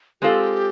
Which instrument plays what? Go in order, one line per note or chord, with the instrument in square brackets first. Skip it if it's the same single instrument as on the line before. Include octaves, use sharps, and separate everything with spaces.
[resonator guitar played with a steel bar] G#3 C4 F4 A4 [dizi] G4